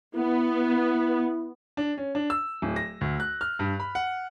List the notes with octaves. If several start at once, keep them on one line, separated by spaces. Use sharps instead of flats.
B3 E4
D4
C#4
D4
E6
D1
A#6
D2
F#6
F6
G2
B5
F#5